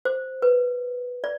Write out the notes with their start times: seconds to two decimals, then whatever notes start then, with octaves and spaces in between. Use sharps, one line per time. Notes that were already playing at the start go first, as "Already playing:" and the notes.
0.05 C5
0.42 B4
1.24 D5